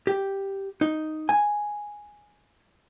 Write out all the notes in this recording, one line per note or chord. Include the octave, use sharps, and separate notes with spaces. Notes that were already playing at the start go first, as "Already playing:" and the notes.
G4
D#4
G#5